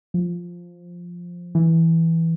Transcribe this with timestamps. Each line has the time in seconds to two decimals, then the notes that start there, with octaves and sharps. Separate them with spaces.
0.14 F3
1.55 E3